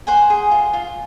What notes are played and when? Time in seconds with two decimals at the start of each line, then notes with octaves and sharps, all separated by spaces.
0.07 C5 F#5 G#5
0.30 G#4
0.51 F4
0.73 F4